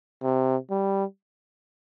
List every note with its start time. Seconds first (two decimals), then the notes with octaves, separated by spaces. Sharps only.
0.23 C3
0.70 G3